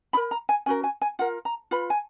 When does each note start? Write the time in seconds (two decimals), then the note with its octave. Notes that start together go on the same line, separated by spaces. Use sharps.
0.13 D#4 B5
0.17 A#4
0.31 A#5
0.49 G#5
0.66 C#4 F#4 A#4 G#5
0.84 G#5
1.02 G#5
1.19 F4 A#4 F#5
1.45 A#5
1.71 F4 B4 B5
1.90 G#5